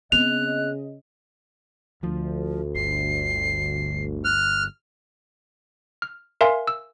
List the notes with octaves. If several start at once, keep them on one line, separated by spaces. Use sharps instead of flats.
C#3 B3 C4 D#5 F#6 F7
D2 F3
G1 C7
F6 F#6
F6
A#4 E5 F5 G#5 C6
E6